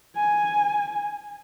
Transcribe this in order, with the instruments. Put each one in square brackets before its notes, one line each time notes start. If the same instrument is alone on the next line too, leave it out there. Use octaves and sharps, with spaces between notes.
[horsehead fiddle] G#5